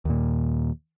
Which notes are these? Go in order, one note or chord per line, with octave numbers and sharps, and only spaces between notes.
D#2 A#2